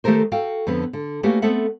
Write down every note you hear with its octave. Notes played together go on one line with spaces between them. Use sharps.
D#3 A3 G4 A4 A#4 C5
F#4 A4 F5 G5
F2 D3 B3 B4
D3
A3 A#3 C#4 F#4 G4 B4
A3 B3 C4 A4 E5 F#5